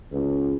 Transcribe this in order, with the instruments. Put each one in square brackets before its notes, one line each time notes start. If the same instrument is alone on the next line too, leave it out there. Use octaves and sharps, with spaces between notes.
[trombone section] C#2